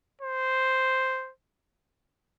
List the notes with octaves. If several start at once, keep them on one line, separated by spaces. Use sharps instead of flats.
C5